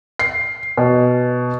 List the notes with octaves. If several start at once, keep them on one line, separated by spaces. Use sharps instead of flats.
C7
B2